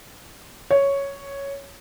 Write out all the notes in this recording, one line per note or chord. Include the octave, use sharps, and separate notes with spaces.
C#5